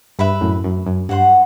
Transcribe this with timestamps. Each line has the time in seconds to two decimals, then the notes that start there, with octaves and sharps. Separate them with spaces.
0.19 G2 B4 E5 B5
0.41 F#2 A2
0.64 F#2
0.86 F#2
1.09 G2 F#4 C5 F#5 C6